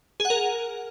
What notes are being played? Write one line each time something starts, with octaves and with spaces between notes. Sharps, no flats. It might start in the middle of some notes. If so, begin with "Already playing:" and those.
G#4
F#5
A#4